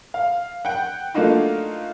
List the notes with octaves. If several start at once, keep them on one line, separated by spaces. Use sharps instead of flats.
F5
F#5 G5
A3 A#3 D4 D#4 F4 F#4